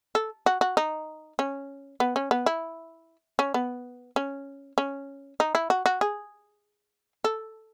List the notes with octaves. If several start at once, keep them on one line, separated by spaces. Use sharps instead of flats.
A4
F#4
F#4
D#4
C#4
B3
C#4
B3
E4
C#4
B3
C#4
C#4
D#4
E4
F#4
F#4
G#4
A4